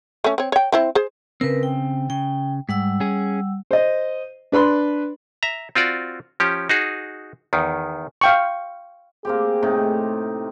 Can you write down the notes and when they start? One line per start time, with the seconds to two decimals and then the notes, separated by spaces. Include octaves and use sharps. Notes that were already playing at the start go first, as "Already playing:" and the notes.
0.24 A3 C#4
0.38 C4 C#5
0.52 C#5 G5
0.72 C4 E4 C5
0.95 G#4 C5
1.41 C#3 C4 A#4 B4
1.63 G5
2.10 C#3 G5
2.69 G#2 G3 F#5 E6
3.00 C#4 G#4
3.71 C5 D#5
4.52 D4 B4 B5 C6
5.43 E5 A#5
5.75 C4 F4 F#4 D5
6.40 F3 C#4 G4
6.69 D#4 F#4 G#4
7.53 E2 D#3
8.21 F5 G5 C#6
9.25 A#3 C4 G4 G#4
9.62 A2 C3 D#4